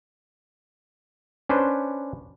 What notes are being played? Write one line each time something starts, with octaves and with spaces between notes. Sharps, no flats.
C#4 D4 B4 C5